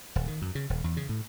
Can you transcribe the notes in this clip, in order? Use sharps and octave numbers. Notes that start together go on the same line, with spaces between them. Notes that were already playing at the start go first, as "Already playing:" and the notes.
D#1
D#3
F#2
C#3
D#1
E2
C#3
A2